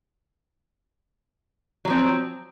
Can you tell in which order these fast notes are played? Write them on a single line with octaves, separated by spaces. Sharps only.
F#3 F3 C4